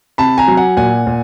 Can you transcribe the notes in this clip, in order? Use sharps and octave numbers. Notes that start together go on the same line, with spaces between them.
C3 A5 B5
G#5 A#5
F#3
F#5 G#5
A#2 F#5 G#5
A#2